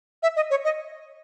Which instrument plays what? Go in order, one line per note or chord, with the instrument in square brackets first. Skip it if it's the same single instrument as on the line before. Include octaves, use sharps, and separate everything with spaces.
[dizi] E5
D#5
C#5
D#5